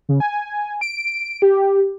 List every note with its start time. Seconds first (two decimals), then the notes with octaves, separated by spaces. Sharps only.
0.09 C#3
0.20 G#5
0.81 D7
1.42 G4